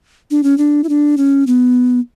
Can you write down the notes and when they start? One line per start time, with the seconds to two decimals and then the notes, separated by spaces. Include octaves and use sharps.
0.31 D4
0.43 C#4
0.58 D4
0.84 E4
0.89 D4
1.17 C#4
1.47 B3